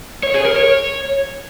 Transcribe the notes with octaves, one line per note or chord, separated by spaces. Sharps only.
C#5
G#4
A#4
C#5